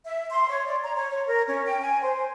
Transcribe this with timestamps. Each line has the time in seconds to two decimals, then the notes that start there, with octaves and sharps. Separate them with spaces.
0.06 E5
0.31 C6
0.49 C#5
0.66 D5
0.81 A#5
0.95 C#5
1.10 C#5
1.27 A#4
1.48 C#4
1.66 G5
1.81 G#5
2.02 C5